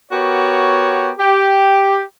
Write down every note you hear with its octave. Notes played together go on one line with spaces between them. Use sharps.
B3 F#4 G4 A#4 C#5
G4